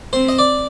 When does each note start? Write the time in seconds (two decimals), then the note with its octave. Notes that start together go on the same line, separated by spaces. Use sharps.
0.13 C4 C5
0.29 D#5
0.39 D5